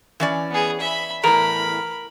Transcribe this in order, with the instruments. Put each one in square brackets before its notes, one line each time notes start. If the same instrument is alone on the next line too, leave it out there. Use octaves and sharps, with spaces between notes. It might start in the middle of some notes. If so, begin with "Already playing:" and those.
[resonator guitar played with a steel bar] E3 C#4 D5
[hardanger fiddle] B3 G#4
E5 B5
[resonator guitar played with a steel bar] E2 A2 [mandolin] A#4 [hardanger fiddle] B5